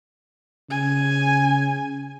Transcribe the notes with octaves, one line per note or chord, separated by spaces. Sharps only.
C#3 G#5